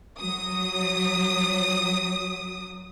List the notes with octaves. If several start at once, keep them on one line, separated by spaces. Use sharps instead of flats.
F#3 D#6